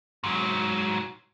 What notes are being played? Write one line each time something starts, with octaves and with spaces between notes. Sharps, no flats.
G#2 F#3